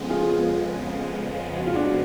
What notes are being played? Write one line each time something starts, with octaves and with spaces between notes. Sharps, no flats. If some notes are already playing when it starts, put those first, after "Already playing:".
Already playing: F2 C#3 F3 G#3 B3
F4 G#4
F#4
F4
D4 F#4